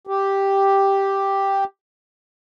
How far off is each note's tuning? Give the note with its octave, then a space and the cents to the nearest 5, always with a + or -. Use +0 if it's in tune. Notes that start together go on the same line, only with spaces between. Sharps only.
G4 +0